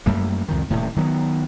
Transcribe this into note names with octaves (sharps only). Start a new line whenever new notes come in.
F#2 G3 A3 A#3
C2 F2 D#3
D#1 A2 C3
D#3 F#3 B3